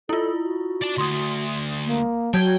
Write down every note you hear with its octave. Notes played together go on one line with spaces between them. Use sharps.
E4 F4 A4
F#4
D5 A5
D2 C6 D#6
A#3
F#3 G5 A5 G6 G#6